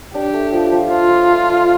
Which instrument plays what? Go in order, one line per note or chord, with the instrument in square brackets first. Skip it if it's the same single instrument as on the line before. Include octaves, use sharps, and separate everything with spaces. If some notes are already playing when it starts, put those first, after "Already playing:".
[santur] D4 [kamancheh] G4
[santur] A3
F3
F3
[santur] F3 [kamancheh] F4
[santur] F3
A3
F3